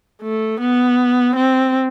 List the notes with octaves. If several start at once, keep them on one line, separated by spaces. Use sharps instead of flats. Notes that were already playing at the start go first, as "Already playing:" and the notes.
A3
B3
C4